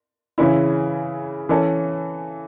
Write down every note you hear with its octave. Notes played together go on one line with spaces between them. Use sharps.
C#3 E3 C#4 E4
E3 C#4 A4